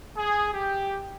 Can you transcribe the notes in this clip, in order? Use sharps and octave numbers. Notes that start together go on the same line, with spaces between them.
G#4
G4